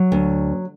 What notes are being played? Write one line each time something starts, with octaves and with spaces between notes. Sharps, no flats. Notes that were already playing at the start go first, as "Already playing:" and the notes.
Already playing: F#3
D2